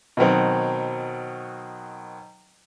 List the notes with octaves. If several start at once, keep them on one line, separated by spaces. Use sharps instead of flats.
B2 D#3 F#3 C4